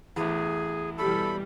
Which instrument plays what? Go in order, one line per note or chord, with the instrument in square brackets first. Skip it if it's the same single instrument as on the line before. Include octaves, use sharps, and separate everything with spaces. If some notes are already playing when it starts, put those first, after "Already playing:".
[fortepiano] A1 E2 [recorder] G#4
[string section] B2 E3 G3 [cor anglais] A4 [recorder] B5